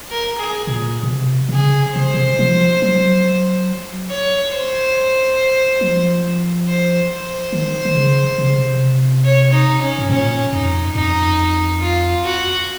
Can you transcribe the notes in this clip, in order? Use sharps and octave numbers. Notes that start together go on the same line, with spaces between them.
A#4
G#4
A#2
A#2
C3
C3
C#3 G#4
C3 C5
C#3
C3
F3
F#3
C#5
C5
F3
C5
C5
D#3
D#3
C#3
C3
C#3
C3
C#5
D#4
C#4
G#2
A#2 C#4
F2 D#4
F2 D#4
F4
F#4